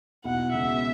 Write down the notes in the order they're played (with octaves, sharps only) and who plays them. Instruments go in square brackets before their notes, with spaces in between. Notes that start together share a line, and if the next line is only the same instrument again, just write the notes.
[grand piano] B1 B2 B3 E4 [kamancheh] F#5
[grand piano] C#2 B2 G#3 B3 [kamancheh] E5